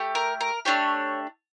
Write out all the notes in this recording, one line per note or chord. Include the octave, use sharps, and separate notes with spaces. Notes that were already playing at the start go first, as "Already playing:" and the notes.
Already playing: A3 G4
A#4
A#4
A3 D4 G4 C#5